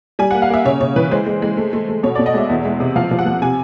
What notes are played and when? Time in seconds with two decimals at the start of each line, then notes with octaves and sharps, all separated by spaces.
0.19 G3 G#5
0.31 F#5
0.34 A#3
0.42 F5
0.50 A#3 E5
0.65 C#3 C#5
0.81 C#3 C#5
0.96 E3 B4
1.11 G#3 C5
1.26 G#3
1.42 G#3
1.57 A3
1.73 A3
1.89 A3
2.03 B2 C#5
2.15 D5
2.19 B2
2.26 D#5
2.34 G#3 E5
2.50 E2
2.65 G#3
2.80 C3
2.96 F3 F5
3.11 F3
3.19 F#5
3.26 F3
3.42 C3 G#5